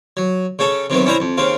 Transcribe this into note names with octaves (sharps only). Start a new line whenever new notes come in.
F#3
C#3 C#4 A4
C3 D#3 F#3 B3
C#4 D4 E4 C5 E5 A#5
F2
D#2 C#3 C4 F5